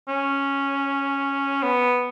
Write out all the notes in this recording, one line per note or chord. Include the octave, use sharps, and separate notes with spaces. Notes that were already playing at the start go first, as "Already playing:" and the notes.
C#4
B3